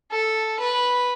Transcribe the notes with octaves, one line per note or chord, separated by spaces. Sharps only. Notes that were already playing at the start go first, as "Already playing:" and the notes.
A4
B4